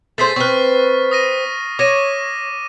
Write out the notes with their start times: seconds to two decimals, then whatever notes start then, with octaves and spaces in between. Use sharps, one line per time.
0.18 A3 G#4 C5 A6 B6 C7
0.36 C4 B4 C#6 F6
1.11 D#6 A#6 D#7
1.79 C#5 D6 A#6 D#7